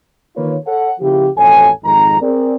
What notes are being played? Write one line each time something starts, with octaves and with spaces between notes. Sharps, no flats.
D#3 A#3 F4 B4 C#5
A4 C#5 F#5
C#3 F3 A#3 E4 F4 G4
A1 F2 B2 A4 C#5 G#5
G#1 F2 D#3 G#3 D#4 A#5
C4 G#4 A#4 D5